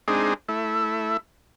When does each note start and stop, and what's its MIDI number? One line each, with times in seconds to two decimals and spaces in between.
0.08 0.34 56
0.08 0.34 60
0.08 0.34 62
0.08 0.34 63
0.08 0.34 68
0.49 1.17 57
0.49 1.17 64